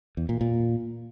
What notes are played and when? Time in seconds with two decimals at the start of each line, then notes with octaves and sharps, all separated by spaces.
0.17 E2
0.29 A#2
0.41 A#2